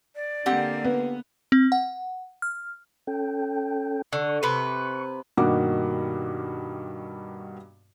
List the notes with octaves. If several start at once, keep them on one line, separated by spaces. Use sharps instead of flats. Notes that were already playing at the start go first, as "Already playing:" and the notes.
D5
D3 A#3 C4 G4 F#5
B3
C4
F#5
F6
C#4 A4 G5
D3 C#6
C3 B4
G2 B2 D#3 A#3 F#4 D6